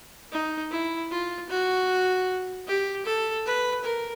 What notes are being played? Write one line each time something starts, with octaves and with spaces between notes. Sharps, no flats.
D#4
E4
F4
F#4
G4
A4
B4
A#4